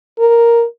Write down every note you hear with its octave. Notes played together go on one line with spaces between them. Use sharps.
A#4